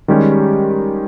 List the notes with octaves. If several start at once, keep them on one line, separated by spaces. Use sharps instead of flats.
D#3 G3 G#3 C#4 G4